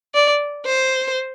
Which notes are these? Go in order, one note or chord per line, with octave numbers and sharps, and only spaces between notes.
D5
C5